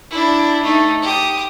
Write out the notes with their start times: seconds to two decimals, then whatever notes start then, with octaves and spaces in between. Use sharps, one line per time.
0.10 D4 E4
0.63 A3 D#4
1.02 G4 D#6